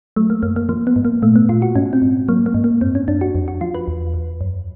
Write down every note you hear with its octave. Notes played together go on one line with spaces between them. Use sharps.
F#3 A3
A#3
F#2 A#3
A#3
F3 A#3
B3
G#2
A#3
A#2 A3
B3
A#2 F4
F#4
G#2 C#4
C4
G#2
F#3 A#3
A#3
G#2
A#3
F#2 C4
C#4
F#2 D4
F#4
F2
F#4
F3 F4
B4
E2
E2
F#2